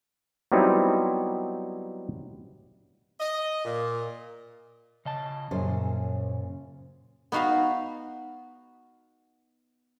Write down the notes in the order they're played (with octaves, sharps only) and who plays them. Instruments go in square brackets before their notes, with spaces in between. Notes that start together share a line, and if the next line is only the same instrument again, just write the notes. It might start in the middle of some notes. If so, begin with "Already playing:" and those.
[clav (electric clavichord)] F#3 G3 B3 C4 D#4 E4
[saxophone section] D#5
A#2
[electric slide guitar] C#3 D#5 A5
[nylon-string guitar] F#2 C#3 C5 [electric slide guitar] A#2
[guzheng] B3 D#4 F#4 F5 B5